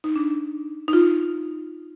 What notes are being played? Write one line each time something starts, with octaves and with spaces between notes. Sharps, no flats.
D#4
D4
D#4
F4